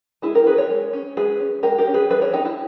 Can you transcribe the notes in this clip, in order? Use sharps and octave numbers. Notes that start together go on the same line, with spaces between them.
G#3 E4 G#4
G4 A#4
C#4 G#4 B4
A#4 C#5
G#3
C#4
G#3 G#4 B4
C#4
G#3 G4 A#4
G4 A#4
C#4
G#4 B4
G3 G#4 B4
A#4 C#5
C#4 D#4 G4
E4